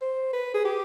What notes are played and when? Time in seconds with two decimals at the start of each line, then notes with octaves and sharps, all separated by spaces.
0.01 C5
0.33 B4
0.54 G#4
0.65 G4